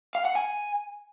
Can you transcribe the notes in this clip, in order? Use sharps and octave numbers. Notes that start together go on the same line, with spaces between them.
F5
F#5
G#5